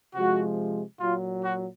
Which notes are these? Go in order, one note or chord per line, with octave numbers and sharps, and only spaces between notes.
C3 F3 G#3 F#4
A#2 F#3 F4
F#4